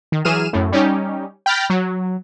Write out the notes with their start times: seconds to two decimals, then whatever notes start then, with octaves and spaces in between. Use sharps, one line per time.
0.12 D#3
0.25 E3 F#3 G#4 F6 D#7 E7
0.53 F#2 A2
0.72 G3 C#4 D#4 G4
1.46 G5 B5 F6 G6 A6 A#6
1.70 F#3